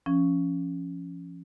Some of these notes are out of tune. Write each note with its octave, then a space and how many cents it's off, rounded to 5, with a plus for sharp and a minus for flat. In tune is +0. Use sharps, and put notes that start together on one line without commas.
F3 -25 C#4 +0